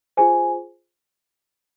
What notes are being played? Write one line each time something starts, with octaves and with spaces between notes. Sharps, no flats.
F4 G#4 C5 G#5